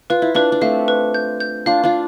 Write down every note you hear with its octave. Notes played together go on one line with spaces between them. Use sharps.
F4 B4
E4
D4 F4 B4
D4
A3 C4 F5
B4
G6
G6
D4 F4 F5
D4 F4